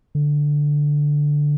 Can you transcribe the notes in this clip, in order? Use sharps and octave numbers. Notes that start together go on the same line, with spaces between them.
D3